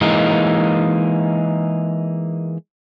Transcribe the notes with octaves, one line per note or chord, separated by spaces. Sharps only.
E3 G#3 A#3 D#4